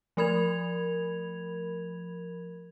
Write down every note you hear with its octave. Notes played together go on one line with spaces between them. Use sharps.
F3 A3 A#4 B5 G#6 F7